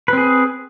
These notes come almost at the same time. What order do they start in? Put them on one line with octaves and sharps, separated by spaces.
B4 C4 G#4